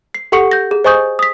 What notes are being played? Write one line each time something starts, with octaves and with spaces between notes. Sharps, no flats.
C7
G4 A4 F#5 C#6 C#7
G6 A#6
G#4
C5 D#5 G#5 C#6 D#6 G6
D#6 B6